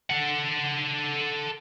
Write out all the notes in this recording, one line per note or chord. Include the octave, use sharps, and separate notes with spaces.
A4 F#5